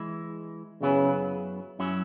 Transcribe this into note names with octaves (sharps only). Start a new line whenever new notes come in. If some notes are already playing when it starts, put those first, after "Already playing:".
Already playing: E3 G#3 E4
F#2 C#3 F#3 B3 E4 B4
F#2 F#3 C#4 E4